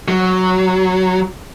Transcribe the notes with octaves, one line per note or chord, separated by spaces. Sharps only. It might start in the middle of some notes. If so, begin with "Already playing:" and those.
F#3